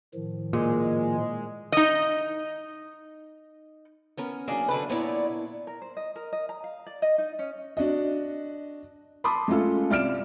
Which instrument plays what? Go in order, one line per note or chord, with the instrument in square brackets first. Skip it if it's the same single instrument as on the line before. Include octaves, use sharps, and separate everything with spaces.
[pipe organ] A2 D#3 F3
[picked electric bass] A#2 [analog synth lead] G#3
[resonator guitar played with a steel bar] D#4 D#5
[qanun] B3 C#4 A#4
[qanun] F#3 D4 [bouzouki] A#3 G#4 D5
[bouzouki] D3 A3 B4
[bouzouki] A#2 C#5 D5 [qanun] B3 E4
[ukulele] A#4
C5
D#5
A#4
D#5
A#5
F5
D5
D#5
D#4
C#4
[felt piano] D4 F#4 D#5
A5 B5 C6 D6 D#6
G#3 A3 C#4 F4 A4
C2 D5 F6 D7 E7